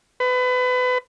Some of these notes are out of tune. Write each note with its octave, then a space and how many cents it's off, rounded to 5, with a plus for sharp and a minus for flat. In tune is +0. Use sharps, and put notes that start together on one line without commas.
B4 +30